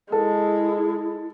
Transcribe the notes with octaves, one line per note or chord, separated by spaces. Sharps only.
G#3 E4 A4